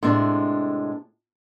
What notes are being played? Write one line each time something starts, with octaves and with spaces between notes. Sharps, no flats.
A2 C3 G#3 D4